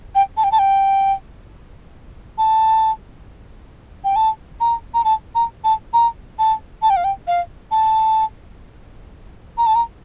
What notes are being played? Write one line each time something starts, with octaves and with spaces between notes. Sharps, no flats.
G5
A5
G5
A5
G5
A5
G5
A5
A#5
A#5
A5
A#5
A5
A#5
A5
A5
G5
F5
G5
F5
A5
A#5
A5
A#5